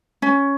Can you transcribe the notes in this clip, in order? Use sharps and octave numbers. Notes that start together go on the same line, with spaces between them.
C#4